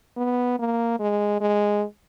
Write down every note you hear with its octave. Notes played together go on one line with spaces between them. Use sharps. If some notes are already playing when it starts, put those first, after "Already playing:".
B3
A#3
G#3
G#3